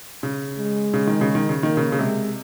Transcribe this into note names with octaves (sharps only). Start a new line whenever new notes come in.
C#3
G#3
C#3
D#3
C#3
D#3
C#3
D#3 A#3
C#3
C#3
C3 G#3